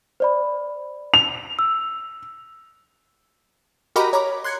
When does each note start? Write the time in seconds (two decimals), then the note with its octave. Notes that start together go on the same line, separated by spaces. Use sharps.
0.20 C5 D5 B5
1.14 F7
1.59 E6
3.96 F#4 G4 A#4 D#5 A#5 B5
4.13 C#5 A#5 B5 D6
4.44 C6 F#6 G#6 C#7